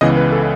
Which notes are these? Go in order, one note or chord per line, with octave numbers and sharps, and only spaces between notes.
C#2 C#3 E3 B3 D#5
B4
A4